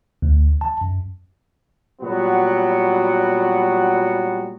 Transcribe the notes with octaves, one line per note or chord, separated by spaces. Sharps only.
D2
A5
F#2
A#2 F#3 G3 B3 F#4